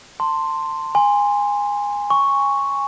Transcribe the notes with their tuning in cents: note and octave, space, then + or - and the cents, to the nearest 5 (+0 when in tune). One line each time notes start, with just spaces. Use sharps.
A5 +25 C6 +0
G#5 -20 C6 +0
G#5 -25 C#6 +0